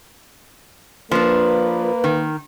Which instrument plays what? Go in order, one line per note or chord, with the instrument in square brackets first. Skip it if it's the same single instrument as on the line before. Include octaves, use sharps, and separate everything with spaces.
[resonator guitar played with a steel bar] F3 D4 [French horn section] A#3 B4
[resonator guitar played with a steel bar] D#3